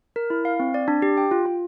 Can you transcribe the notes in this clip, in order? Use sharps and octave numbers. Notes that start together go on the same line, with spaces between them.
A#4
E4
F5
C4
D5
D4
G4
G5
F4
F4